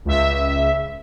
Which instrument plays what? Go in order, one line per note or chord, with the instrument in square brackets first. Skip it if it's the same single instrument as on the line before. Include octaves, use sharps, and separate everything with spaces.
[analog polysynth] C#2 E5